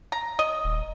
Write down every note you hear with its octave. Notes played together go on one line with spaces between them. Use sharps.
A#5
D#5
D#1